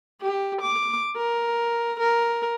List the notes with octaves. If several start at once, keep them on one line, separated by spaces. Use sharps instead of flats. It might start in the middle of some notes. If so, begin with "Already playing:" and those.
G4
D6
A#4
A#4